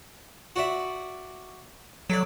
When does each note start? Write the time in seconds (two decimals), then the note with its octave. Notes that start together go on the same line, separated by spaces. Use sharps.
0.56 F#4 D5 E5
2.10 F#3 A4 D5